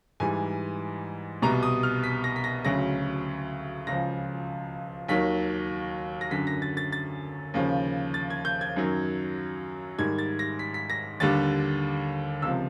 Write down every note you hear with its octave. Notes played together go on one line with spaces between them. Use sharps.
G#2 E3 G3 G#5
C2 B2 G3 A#5
D#6
F6
B6
A#6
B6
A#6
D2 C#3 F#3 A#6
C#2 C#3 F3 A#6
D#2 D#3 F#3 B6
A#6
F#2 D3 F#3 B6
A#6
A6
A6
A6
D#2 C#3 F3
A6
G#6
G6
G#6
F#2 D#3 F#3
G#2 D#3 G3 G#6
A6
A#6
B6
B6
A#6
D#2 D3 G3 A6
C#2 C3 F3 E6